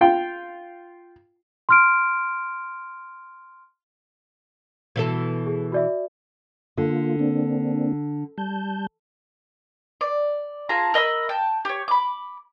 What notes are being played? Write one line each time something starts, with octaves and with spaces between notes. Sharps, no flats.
F4 G5
C6 F6 D7
B2 E3 A4
G#4
F#4 D5 E5
D3 A#3 F4
A#3 C4 D4
G3 A5 G6
D5
F4 G#4 A5 A#5
A#4 D#5 B5 E6
G5 A5
G4 C#5
B5 D6